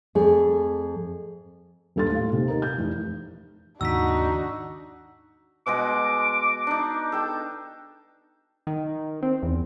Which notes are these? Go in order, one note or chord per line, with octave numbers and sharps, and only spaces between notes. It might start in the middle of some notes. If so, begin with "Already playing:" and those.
F2 A3 G#4
D#1 G2 A4 C6 A6
A2 F5
D#2 C3
D#4 A#4
G6
F1 E3
D#2 G#2 C#3 D4 D#4 F#4 E6 B6
B2 G#3 F#4 D6
D4 D#4
A4 G5 A5
D#3
C4
E2